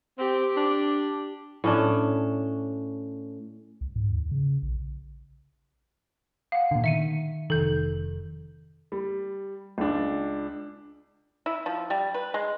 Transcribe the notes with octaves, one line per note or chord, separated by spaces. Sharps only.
C4 G4
D4
A2 C#4 D4
C2
G#2
D#2
C#3
A#1
F5 F#5
A#2 D3
D#3 E5 C#7 D#7
F1 D#3 A4 G6
G3
C#2 D4
E4
F3
G3
B4
G#3